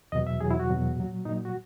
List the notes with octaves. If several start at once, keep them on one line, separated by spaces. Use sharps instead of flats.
E2 B2 F#3 D#5
E5
E2 B2 F#3 G#4
E4
F#4
E2 B2 F#3
A#2 F#3
A#2 F#3 D#4
F#4